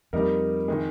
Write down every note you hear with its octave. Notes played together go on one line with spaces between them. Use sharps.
F2 G3 A#3 D#4 A#4
D#3 G#3